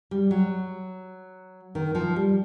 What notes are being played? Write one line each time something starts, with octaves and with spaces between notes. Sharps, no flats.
G3
F#3
D#3
F3
G3